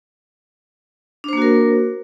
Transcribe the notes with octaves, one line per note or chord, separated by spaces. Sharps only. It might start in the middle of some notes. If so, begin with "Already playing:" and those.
A#3 D4 F#4 A#4 C5